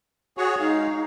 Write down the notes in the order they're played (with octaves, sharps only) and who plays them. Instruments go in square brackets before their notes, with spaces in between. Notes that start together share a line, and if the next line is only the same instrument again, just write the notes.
[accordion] F#4 G#4 C#5
[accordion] G#3 F5 [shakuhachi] D#4